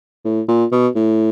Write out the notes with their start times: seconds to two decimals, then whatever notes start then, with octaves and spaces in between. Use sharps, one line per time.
0.25 A2
0.49 A#2
0.72 B2
0.96 A2